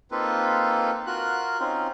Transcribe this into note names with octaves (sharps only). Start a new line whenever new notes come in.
A#3 C4 D#4 F4 A4 B4
F4 F#4 A#4 F#6
C4 C#4 D#4 F4